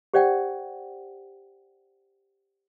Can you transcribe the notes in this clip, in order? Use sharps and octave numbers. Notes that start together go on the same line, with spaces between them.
G4 C5 D5 F#5 G5